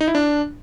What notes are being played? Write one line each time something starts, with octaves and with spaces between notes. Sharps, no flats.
D#4
E4
D4